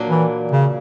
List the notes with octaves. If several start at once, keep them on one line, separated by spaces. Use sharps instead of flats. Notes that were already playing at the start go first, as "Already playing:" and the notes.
Already playing: A#2 F#3 A#3 D4
E3
C#3